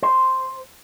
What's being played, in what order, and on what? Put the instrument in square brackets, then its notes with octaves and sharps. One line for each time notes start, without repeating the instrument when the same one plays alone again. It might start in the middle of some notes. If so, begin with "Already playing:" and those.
[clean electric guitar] C5